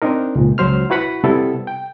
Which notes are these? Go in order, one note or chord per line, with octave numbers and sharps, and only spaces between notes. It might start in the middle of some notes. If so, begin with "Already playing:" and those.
C4 D4 D#4 A#4
C#2 A#2
C#2 F#3 C5 F6
E4 F#4 B4 F#5 B5
C3 G3 B3 E4 A4
G5